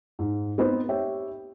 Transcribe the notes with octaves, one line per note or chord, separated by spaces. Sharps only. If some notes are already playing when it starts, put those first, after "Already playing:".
G#2
B3 C4 D#4 B4 C5
G4 C#5 E5 G5